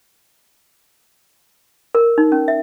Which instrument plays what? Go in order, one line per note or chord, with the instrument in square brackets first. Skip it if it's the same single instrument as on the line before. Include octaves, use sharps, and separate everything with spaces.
[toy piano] A#4
D#4
C#4
E5